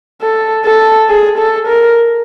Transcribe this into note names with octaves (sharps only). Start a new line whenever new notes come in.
A4
A4
G#4
A4
A#4